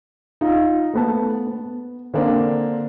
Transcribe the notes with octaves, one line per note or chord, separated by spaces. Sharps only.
D#4 F4
A3 B3 A5
B3
D3 A#3 C4 D4